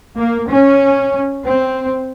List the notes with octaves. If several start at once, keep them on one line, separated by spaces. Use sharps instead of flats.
A#3
C#4
C4